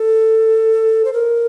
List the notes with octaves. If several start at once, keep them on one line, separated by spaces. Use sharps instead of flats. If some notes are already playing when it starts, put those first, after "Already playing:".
Already playing: A4
C5
A#4